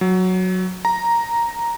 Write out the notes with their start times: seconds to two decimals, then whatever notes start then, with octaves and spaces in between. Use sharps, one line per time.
0.01 F#3
0.85 A#5